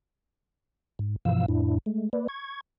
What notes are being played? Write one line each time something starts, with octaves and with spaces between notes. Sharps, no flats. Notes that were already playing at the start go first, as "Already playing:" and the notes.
G#2
G2 B2 E3 F3 F5 E6
F2 A2 D4 E4
G#3 A3
A#3 B4 D5
C#6 G#6